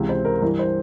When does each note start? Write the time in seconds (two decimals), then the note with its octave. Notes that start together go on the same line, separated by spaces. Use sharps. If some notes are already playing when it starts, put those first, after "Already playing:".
Already playing: C#2 C3 E3
0.09 C5
0.25 A#4
0.42 G2 E3 A#4
0.59 C5